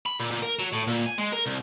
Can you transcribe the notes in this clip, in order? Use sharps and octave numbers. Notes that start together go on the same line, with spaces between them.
B5
A#2
A#2
A#4
F#3
A2
A#2
G#5
G#3
A#4
C2